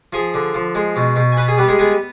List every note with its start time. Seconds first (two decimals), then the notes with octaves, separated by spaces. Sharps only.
0.13 F3 G#4 G#5
0.34 D3
0.54 F3
0.75 G#3
0.96 B2
1.16 B2
1.32 G#5
1.37 B3 B4 B5
1.48 G#4 G#5
1.58 G3 B3 B4
1.68 G#3 G#4
1.79 G#3 B3 G#4